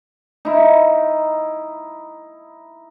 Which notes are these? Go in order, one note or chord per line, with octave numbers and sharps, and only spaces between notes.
D#4 E4